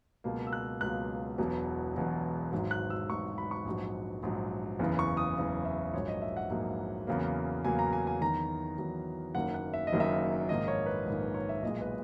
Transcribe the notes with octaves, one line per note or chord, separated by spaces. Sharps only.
C#2 B2 F#3 A#3
E6
F#6
C#2 B2 F#3 A#3 F#6
E1 E2 B2 F#3
E1 E2 B2 F#3
G#1 G#2 F#3
F#6
E6
G#1 G#2 F#3 C#6
B5
C#6
A#1 G#2 F#3
A#1 G#2 F#3
F#1 E2 C#3 E3
C#6
D#6
F#1 E2 C#3 E3
E5
A#1 G#2 F#3 A#3 C#5
D#5
E5
F#5
A#1 G#2 F#3 A#3
E2 C#3 F#3 A#3
E2 C#3 F#3 A#3 G#5
A#5
G#5
G#5
E2 D#3 F#3 A#5
E2 D#3 F#3
F#1 F#2 D#3 F#3 A#3 F#5
F#5
E5
D#5
F#1 F#2 D#3 F#3 A#3
E5
A#1 G#2 D#3 A#3 D#5
C#5
B4
A#1 G#2 D#3 A#3
B4
C#5
E5
B1 A#2 G#3 D#5
B4